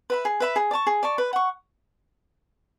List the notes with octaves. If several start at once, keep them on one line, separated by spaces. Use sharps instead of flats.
B4 E5 B5
G#4
B4 E5 B5
G#4
D5 A5 C#6
G#4
D5 A5 C#6
B4
F#5 C#6